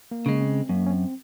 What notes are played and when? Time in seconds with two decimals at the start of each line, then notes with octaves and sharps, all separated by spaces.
0.11 A#3
0.26 C#3 G#3
0.41 C4
0.69 F#2 A#3 C#4
0.87 C#4
0.91 C4